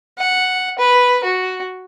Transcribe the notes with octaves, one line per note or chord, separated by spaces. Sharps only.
F#5
B4
F#4